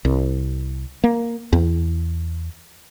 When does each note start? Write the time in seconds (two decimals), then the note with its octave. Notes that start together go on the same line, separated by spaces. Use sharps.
0.05 C2
1.04 A#3
1.53 E2